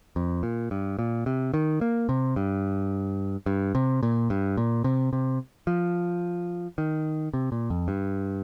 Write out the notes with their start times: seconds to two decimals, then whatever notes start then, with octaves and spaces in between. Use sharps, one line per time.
0.16 F2
0.43 A#2
0.71 G2
0.99 A#2
1.26 C3
1.54 D#3
1.81 A#3
2.09 C3
2.36 G2
3.46 G2
3.75 C3
4.03 A#2
4.30 G2
4.57 A#2
4.84 C3
5.13 C3
5.67 F3
6.78 D#3
7.34 C3
7.52 A#2
7.70 F2
7.88 G2